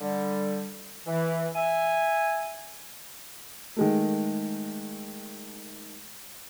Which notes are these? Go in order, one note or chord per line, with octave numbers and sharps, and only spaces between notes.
D3 G3
E3
E5 G#5
D#3 G#3 A3